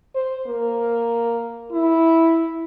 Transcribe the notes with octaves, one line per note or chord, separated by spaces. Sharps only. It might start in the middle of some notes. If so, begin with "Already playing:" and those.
C5
A#3
E4